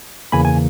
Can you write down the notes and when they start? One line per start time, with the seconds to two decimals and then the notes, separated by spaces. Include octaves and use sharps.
0.32 E2 C#3 E3 A#3 G#5 B5
0.45 G#5